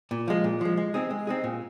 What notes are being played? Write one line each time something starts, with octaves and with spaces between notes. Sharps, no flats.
A#2
F3 G#3
A#2
F3 G#3
G#3
C4 D#4 G#4
G#3
C4 D#4 G#4
A#2